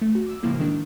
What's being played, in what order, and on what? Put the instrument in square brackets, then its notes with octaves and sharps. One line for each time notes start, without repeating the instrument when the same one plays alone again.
[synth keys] A3
F#4
D6 E6
A2 C#3 F3 G#3 A#3 E4
D#3 G#3 D4